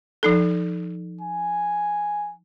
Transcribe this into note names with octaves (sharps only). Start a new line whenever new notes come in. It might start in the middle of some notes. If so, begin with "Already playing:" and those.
F3 D#4 A4
G#5